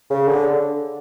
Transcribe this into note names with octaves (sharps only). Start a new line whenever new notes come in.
C#3
D3